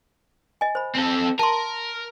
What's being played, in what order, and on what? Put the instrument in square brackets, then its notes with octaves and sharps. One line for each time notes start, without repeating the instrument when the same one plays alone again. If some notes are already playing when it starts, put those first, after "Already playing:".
[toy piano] D#5 G#5
C5 B5
[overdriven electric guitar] C4 A4
[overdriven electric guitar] A#4 [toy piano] A5 C6